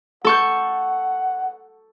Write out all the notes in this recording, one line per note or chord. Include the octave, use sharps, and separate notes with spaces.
A4 F#5 C#6 G6